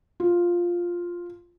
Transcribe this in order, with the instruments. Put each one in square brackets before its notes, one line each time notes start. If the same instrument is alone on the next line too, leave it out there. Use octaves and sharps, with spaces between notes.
[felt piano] F4